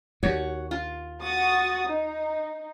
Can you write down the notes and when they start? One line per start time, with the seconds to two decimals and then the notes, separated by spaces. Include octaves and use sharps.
0.23 D#2 F#4 C#5
0.71 F4
1.22 F#4 D#6 A6
1.86 D#4